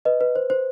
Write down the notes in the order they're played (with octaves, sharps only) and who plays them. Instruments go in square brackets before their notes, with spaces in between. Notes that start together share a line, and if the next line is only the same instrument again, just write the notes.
[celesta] B4 D#5
B4
C5
C5